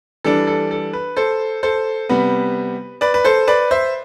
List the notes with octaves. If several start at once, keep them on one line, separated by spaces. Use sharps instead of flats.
E3 G3 D4 A4
A4
A4
B4
A4 C5
A4 C5
C3 G3 B3 B4
B4 D5
B4
A4 C5
B4 D5
C5 E5